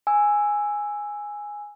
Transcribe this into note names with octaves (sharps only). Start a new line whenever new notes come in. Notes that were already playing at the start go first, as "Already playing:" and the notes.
G#5 E6